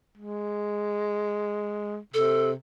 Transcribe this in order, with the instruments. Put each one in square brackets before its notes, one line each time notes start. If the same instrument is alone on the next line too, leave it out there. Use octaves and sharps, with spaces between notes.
[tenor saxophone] G#3
[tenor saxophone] C3 [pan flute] A4